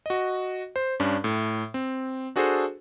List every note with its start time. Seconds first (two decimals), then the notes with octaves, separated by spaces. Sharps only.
0.06 F#4 D#5
0.76 C5
1.00 G2 C#4 D4
1.24 A2
1.74 C4
2.36 D4 F#4 G#4 A4 C5